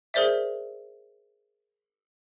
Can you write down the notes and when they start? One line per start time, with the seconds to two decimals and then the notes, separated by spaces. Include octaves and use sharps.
0.14 G#4 A#4 C5 D5 E5